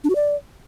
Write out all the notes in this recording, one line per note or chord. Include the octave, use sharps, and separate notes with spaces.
D4
F#4
D5